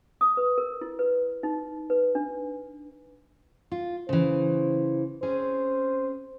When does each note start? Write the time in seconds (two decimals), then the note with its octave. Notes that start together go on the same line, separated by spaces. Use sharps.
0.21 D#6
0.37 B4
0.58 A#4
0.81 E4
0.99 B4
1.43 D#4
1.90 B4
2.15 D4
3.72 F4
4.09 C#3 E3 C5
5.23 C4 C#4 G#4 C5